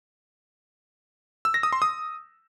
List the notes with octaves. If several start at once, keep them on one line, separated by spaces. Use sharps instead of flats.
E6
A#6
D#6
C6
D#6